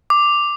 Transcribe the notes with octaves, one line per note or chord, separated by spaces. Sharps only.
D6